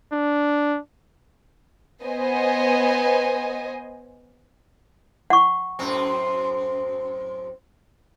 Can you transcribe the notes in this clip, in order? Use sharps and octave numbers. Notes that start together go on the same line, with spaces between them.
D4
B3 C5 D#5 G#5
F#5 C#6
F#2 A2 C4